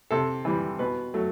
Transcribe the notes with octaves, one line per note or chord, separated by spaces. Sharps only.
C3 A4
E3 G3
B2 B4
F#3 A3